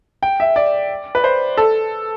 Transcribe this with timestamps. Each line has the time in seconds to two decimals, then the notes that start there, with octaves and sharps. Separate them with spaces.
0.23 G5
0.40 E5
0.56 D5
1.15 B4
1.24 C5
1.57 A4